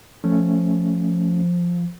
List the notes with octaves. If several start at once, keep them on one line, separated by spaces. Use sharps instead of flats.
F3 A3 C#4